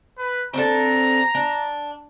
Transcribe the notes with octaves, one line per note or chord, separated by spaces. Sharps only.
B4
C4 D4 A4 A#5
D4